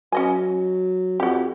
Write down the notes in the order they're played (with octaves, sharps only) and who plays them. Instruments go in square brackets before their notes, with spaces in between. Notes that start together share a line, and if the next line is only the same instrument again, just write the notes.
[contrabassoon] F#3 [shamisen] C#4 D#5 G#5
[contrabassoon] F2 [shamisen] F#4 G4